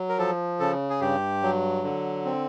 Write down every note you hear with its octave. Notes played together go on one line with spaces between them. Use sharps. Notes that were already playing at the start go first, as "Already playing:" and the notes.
Already playing: F#3
A#4
F3 A4
C#3 A4
G#4
G2 G4
F#3
D3
C4